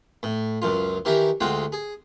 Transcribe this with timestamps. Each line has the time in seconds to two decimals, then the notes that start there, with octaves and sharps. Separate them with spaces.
0.23 A2
0.62 C#2 F#2 F4
1.05 D#3 E3 G4 A#4
1.40 D2 G#3 F4 F#4 G5
1.72 G#4